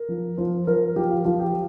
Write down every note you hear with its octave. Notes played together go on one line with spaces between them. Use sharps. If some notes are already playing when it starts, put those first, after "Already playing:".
Already playing: A#4
F3
F3 C5
F3 A#4
F3 G4
F4
F3 F4
G4